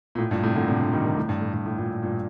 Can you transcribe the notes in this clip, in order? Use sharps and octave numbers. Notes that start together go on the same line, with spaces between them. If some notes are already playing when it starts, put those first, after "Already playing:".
A#2
A2
G2 A#2
A2 C3
A#2 D3
A2 C3
A#2 D3
D#3 G3
C3 D#3
A2
G2
A2
G2
A2
G2 A#2
G2 A#2